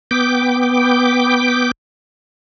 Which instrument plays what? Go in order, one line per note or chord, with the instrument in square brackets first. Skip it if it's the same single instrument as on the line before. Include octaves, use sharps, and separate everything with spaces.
[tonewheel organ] B3 G5 D6